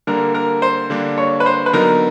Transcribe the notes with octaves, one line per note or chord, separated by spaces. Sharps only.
D3 G3 A#3 D4 A#4
A#4
C5
D3 G3 A#3 D4
C#5
B4
C5
B4
D3 F#3 B3 D#4 A#4